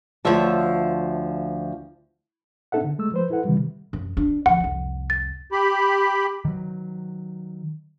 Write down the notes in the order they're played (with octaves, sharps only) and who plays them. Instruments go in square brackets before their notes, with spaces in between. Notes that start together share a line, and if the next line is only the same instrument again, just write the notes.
[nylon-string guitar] D2 F3 F4 C#5 E5 A5
[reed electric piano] C4 D4 D#4 A4 E5 F#5
D3
G#3 A3 E6
F3 B4 C5
E4 A4 B4 F#5
C3 D#3 E3 G3
[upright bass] F#2
D4
[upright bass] D3 F3 [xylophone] F#5
[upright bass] C2 F2
[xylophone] A6
[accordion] G4 B5
[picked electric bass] D#3 F#3